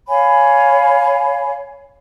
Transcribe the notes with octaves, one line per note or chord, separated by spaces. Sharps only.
C#5 F5 G#5 B5